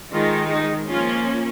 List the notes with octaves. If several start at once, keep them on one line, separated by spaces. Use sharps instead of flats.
D#3 G#3 D#4 F4
D#4
F3 A#3 C#4 F4